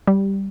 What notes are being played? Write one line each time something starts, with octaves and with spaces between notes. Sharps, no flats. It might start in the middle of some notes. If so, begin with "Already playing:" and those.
G3